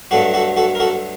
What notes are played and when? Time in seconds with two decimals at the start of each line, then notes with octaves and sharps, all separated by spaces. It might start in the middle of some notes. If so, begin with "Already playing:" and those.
0.11 G2 F#3 A3 F#4 A4
0.34 F#4 A4
0.57 F#4 A4
0.75 A#4
0.80 F#4 A4